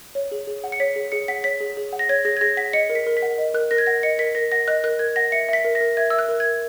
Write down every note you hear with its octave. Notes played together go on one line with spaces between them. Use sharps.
C#5
G#4
G#4
F#5
C#7
C#5 B6
G#4
G#4 C#7
F#5 B6
C#5 B6
G#4
G#4
F#5
A#6
C#5 G#6
G#4 A#6
G#6
G#4 A#6
F#5 B6
D#5 C#7
A#4
B6
A#4
B6
F#5
D#5
A#4 F#6
A#4 A#6
G#6
F#5 A#6
D#5 C#7
A#4 B6
A#4 A#6
F#5 A#6
D#5 F#6
A#4 F#6
A#4 G#6
F#5 A#6
E5 C#7
E5 B6
A#4
A#6
A#4
E5 G#6
E5 E6
F#6
A#4
G#6
A#4